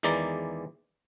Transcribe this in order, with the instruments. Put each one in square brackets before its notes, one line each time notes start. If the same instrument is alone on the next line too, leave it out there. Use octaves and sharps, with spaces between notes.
[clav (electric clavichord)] E2 D#3 E3 G#3 D5 A#5